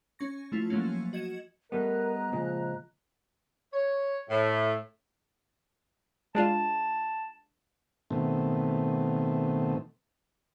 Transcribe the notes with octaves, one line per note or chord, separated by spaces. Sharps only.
C#4 C#6 A#6
F3 A3 E4 F4
F3 F#3 A3 A#3 C#4
F#4 D#5 G#6 C#7 E7
G3 A3 B3 A#4 D#5 A#5 F#6
A#2 C#3 F3 G#3
C#5
A2
G#3 D4 F4 A5
B2 D#3 A3 C4